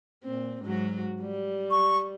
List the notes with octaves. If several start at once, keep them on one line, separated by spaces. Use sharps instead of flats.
A#2 C4
G#2 F#3 F#4
G3
C#6